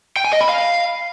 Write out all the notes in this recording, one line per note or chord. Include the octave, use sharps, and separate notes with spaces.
G5
G#5
D#5
B5
F5